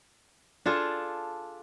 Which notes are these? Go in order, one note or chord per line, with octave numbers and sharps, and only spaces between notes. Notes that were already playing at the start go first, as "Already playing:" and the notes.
D4 F4 G#4 A4